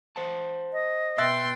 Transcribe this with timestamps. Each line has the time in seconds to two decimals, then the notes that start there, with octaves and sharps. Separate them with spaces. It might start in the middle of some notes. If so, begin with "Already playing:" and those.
0.16 C5 F#5 A5
0.73 D#5
1.18 B2 E5 G5 C6 F#6 A6